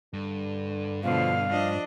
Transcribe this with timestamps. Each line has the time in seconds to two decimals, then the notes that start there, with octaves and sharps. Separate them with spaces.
0.13 G2 D3
1.03 B2 D3 F3 F5
1.51 F3 D4 D#5